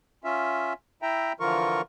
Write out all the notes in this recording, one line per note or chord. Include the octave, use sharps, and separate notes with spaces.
C#4 F4 E5
E4 E5 G5 A#5
D3 E3 F3 F4 A#4 C#6